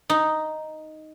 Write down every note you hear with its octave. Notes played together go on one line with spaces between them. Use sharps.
D#4